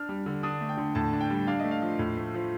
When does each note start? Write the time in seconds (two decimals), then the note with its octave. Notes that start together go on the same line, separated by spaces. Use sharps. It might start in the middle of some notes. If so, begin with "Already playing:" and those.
Already playing: D4 F6
0.09 G3
0.26 D3
0.43 D4 D#6
0.61 A3
0.69 G5
0.77 D3
0.95 A2 A5
1.13 D4
1.21 G5
1.30 G3
1.47 D4 F5
1.59 A3 D#5
1.71 F5
1.82 F3
1.99 A2
2.16 A3
2.34 F3